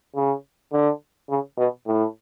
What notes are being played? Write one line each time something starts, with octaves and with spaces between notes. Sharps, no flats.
C#3
D3
C#3
B2
A2